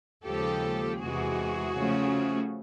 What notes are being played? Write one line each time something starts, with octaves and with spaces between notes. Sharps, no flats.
D#2 C#3 F3 G#3 G4 A4
E2 C3 E3 G#3 F#4 G#4
C#3 F3 A3 C#4